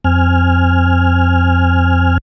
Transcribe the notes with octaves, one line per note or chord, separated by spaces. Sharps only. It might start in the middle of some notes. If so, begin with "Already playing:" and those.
F2 C4 G#5 F6